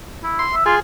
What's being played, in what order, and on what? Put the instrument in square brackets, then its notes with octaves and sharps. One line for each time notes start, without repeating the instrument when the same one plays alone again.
[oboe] E4
[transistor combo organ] C6
[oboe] E5
[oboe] F4 [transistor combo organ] G#4